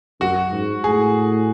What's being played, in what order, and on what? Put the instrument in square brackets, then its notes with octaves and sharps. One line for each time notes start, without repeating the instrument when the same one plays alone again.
[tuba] F#2 [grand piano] F#4
[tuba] G#2
[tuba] A2 [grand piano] G#4